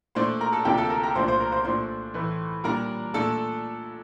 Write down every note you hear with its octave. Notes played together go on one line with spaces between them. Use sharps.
A#2 A3 D4 C5 C6
A#4 A#5
A4 A5
D2 C3 F3 A#3 D4 G4 G5
A4 A5
A#4 A#5
A#4 A#5
C2 A#2 F3 A3 D4 C5 C6
C5 C6
A#4 A#5
C5 C6
A#2 F3 A3 D4 C5 C6
A2 E3 A3
A#2 G3 D4 A#4 A#5
A#2 A3 D4 A4 A5